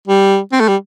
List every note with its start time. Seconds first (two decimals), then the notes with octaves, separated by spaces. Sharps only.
0.08 G3
0.52 C4
0.60 A3
0.68 G3